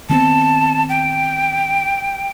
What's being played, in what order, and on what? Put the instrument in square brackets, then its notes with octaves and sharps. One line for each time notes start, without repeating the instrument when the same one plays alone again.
[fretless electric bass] D#3 B3 C4 [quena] A5
[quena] G5